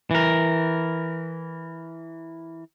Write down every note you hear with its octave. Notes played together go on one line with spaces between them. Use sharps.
E3 A#4